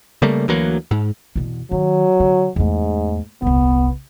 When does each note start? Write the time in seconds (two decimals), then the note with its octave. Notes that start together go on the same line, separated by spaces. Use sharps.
0.22 C#3 G3 A3 A#3
0.48 D2 E3 F#3 A#3
0.91 G#2
1.36 E2 B2
1.71 D#3 F#3
2.20 D3
2.56 E2 G#2 A3
3.42 D#1 C2 B3